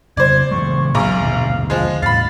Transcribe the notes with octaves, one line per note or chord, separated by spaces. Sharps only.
F2 C#3 C5 D5 G#6
C#3 E3 G#3 C#6
A#1 A#2 F#3 F5 A#5 D6
D#2 B2 D3
F3 G#3
E2 A2 F5 B5 A6